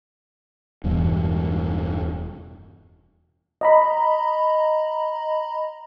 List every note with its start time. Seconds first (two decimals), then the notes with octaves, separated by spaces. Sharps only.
0.84 E1 E2 G2
3.61 D#5 A#5 B5